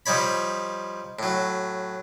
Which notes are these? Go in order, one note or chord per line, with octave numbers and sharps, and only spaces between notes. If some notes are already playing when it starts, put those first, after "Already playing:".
F3 G3 D#4 C#5 B5
A2 F#3